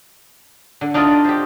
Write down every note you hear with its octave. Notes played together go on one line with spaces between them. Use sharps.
D3
D4 D#4 F4 D5 D#5
G4 C5